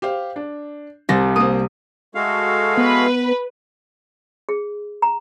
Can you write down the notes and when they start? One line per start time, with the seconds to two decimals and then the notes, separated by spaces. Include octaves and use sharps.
0.02 G4 C5 F5
0.36 D4
1.09 C2 C3 A6 A#6
1.36 A#3 C4 D#6
2.15 G#3 A3 F#4 A4 F5
2.78 B3 B4
4.49 G#4
5.02 A#5